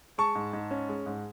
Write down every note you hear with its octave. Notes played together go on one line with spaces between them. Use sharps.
G#3 A5 C#6
G#2
G#2
C#4
G#3
G#2